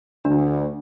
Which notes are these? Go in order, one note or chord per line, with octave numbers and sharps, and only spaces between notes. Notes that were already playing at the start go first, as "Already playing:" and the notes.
D2 D4